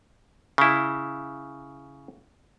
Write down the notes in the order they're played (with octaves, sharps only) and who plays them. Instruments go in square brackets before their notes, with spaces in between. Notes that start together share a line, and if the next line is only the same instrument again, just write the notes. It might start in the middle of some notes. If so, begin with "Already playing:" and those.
[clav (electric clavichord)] C#3 E4